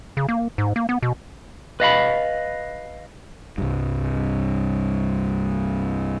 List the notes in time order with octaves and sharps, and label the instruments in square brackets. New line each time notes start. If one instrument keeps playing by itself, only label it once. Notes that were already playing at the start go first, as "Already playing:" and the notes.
[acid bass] C#3
A#3
G#2
A#3
B3
B2
[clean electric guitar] B4 D#5 F5 B5
[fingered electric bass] C2 G2